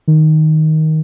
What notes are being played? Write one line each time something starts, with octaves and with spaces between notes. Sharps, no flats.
D#3